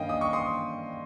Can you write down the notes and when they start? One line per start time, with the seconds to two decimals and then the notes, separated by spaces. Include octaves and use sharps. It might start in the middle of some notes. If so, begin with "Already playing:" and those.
Already playing: G2 D#3 A#3 C#4 D#5 F5 G5
0.09 D#6
0.21 C#6
0.33 C6 D#6